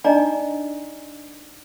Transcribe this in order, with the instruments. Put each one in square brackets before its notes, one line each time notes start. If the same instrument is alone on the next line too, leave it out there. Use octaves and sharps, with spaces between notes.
[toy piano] D4 D#4 D5 D#5 G#5 A#5